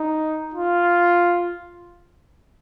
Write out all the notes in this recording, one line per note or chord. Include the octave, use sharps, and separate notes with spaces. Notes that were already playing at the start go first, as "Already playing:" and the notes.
Already playing: D#4
F4